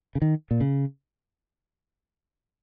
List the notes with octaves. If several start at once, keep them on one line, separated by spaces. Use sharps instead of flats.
C#3
D#3
A#2
C#3